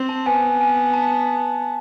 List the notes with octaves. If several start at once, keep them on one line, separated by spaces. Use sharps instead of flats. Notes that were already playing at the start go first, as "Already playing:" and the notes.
Already playing: C4
A5
B3 G#5
G#5
A5